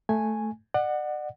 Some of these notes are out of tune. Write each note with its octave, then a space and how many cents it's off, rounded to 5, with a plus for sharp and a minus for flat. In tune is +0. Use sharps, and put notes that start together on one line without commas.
A3 +0 G#5 +0
D5 +40 F#5 +0